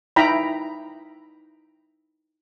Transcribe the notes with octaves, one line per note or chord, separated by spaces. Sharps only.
D#4 E4 G5 A#5 B5